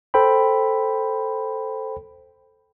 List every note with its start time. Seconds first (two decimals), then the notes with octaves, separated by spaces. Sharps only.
0.14 A4 C5 G5 B5